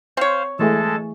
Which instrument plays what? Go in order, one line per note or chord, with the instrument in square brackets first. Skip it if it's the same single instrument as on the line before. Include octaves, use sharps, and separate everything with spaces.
[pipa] C4 C#5 [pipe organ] C5 F5
[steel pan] E3 A3 G#4 [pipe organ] G#3 A4 A5